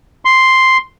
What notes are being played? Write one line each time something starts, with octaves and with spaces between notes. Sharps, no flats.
C6